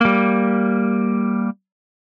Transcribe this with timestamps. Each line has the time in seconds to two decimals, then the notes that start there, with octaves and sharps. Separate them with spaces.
0.01 G3 A#3